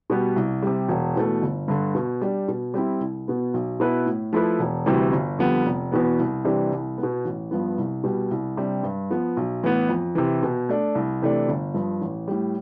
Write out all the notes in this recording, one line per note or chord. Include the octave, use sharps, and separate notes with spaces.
B2 G3 B3
C2
C3 G3
E1
E2 B2 A3
G1
G2 D3
B2
G3 D4
B2
G3 C4 E4
C2
B2 B3
B1
B2 B3 E4 B4
A2
F3 A3 E4 B4
E1
D2 C3 E3 G3
G1
F2 D3 G3 B3
F1
E2 B2 B3
C2
C3 E3 G3 D4
C2
B3
B2
A1
G2 F3 B3
C2
B2 G3
C2
C3 G3 D4
G2
F3 B3
B1
A2 E3 B3
F2
C3 E3
B2
A3 D4
C2
C3 E3 A3 D4
G1
G2 F3
A1
A2 G3